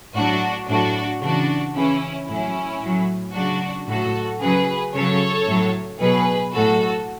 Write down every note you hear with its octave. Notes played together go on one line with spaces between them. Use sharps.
A2 F#3 D4 F#4
A2 F#3 D4 F#4
C#3 E3 D4 F#4
C#3 E3 C#4 E4
A2 F#3 C#4 E4
A2 F#3
C#3 F#3 D4 F#4
A2 F#3 F#4 A4
C#3 F#3 G#4 B4
C#3 F#3 A4 C#5
A2 F#3
B2 F#3 G#4 B4
A2 F#3 F#4 A4